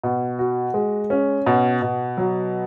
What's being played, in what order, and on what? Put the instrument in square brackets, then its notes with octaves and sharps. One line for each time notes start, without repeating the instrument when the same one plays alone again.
[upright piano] B2
F#4
G#3
C#4
B2
B2
F#3